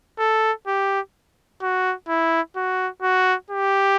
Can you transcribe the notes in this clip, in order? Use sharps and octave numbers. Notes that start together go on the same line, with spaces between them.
A4
G4
F#4
E4
F#4
F#4
G4